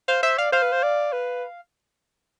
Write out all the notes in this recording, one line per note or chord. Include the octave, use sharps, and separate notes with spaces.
C5 F5
C5 E5
D5 F5
C5 F5
B4
C5
D5
B4